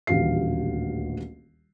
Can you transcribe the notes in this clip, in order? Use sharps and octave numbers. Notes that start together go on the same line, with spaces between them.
D#1 A1 D2 G4 F5 C7